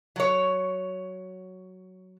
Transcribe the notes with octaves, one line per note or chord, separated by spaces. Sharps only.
F#3 C#5